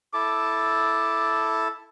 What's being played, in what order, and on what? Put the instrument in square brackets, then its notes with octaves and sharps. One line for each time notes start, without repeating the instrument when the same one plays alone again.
[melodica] E4 A4 A5 [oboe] D6